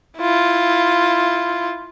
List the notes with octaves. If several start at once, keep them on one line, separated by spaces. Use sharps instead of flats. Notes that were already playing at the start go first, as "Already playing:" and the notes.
E4 F4